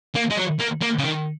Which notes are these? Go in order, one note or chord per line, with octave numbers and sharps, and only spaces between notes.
A#3
G#3
F#3
A#3
A#3
C#3
D#3